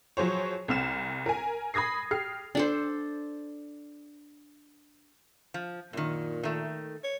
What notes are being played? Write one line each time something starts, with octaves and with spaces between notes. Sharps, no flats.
F3 F#3 G#4 C5 C#5
C2 C4 F6 E7
A#4 G#5
B5 D#6 G#6 A#6 C7
G4 F6 C7
D4 A4 C5
F3
F#2 A#2 D#3
D#3 A3
C#5